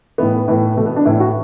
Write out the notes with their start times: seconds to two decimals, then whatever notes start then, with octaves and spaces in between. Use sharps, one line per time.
0.18 A2 E3 B3
0.48 A2 E3
0.77 B2 A3
0.86 B3
0.96 D4
1.05 A2 E3 E4
1.20 F#4